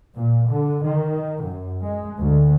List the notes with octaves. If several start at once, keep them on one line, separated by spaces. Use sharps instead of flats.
A#2
D3
D#3
F#2
G#3
D2